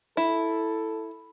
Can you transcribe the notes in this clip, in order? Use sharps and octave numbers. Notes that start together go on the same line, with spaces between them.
E4 A4 B5